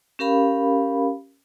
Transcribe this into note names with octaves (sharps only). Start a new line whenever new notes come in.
C#4 G4 A#4 F5 B5